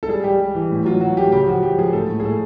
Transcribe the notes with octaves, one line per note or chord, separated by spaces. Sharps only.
A4
G3 G#4
G3 G4
G3
E3
A2
F#3 F4
F#3 F#4
A2 G4
C#3 G4
F3 F#4
F3 G4
F3 G#4
A2 A4
A2
G#4
A2 A4